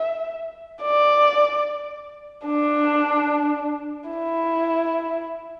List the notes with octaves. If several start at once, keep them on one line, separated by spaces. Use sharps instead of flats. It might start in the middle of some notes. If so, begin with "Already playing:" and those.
Already playing: E5
D5
D4
E4